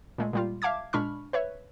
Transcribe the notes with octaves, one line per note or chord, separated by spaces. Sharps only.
A#2 G#3 A3
A#2 G3 F4
E5 F5 A5 D6 G#6
A#2 G#3 D4 B5 C#6 F6
B4 C#5 E5